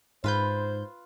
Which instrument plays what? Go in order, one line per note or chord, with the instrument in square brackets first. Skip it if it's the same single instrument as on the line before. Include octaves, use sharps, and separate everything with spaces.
[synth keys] G#2 G6 [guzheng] F4 B4 [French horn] C5